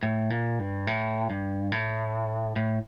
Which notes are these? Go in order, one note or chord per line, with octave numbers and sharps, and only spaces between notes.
A2
A#2
G2
A2
G2
A2
A2